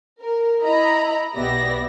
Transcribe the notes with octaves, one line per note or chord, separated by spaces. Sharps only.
A#4
E4 D#5 A#5 B5
B1 B3 G4 D5 E5 A#6